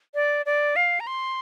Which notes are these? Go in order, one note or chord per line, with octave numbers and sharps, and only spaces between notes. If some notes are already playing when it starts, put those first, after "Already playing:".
D5
D5
F5
A#5
C6